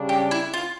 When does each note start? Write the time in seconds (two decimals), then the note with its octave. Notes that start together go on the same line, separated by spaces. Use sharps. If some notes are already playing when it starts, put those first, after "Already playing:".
Already playing: C#3 G3 D4
0.09 G4
0.31 E4
0.54 F4